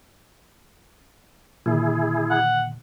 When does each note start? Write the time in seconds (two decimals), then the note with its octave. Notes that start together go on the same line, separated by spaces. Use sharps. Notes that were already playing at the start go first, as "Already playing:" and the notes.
1.66 A#2 D3 D#3 E4 G#4
2.30 F#5